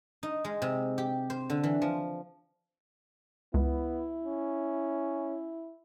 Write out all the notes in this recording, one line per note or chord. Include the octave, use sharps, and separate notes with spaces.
D#4
G#3
C3
G4
C5
D3
E3
F3
C#2 B3 E4
C#4